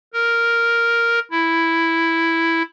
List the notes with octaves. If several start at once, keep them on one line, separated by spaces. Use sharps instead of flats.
A#4
E4